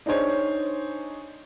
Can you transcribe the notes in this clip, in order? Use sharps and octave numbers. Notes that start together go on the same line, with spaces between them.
D4 D#4 G#4 C5 C#5